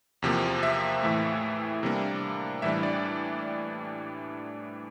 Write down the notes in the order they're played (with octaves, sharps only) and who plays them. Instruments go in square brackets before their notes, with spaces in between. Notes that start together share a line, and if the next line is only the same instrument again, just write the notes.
[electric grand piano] E2 C3 F3 A#3
E5
A2 E3 A3
C3 G3 A#3 D4
A2 E3 G3 D4 E5
D5